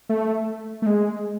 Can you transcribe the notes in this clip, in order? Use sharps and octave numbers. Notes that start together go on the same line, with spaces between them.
A3
A3
G#3